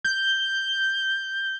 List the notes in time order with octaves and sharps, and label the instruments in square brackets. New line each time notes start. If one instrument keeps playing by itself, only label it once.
[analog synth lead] G6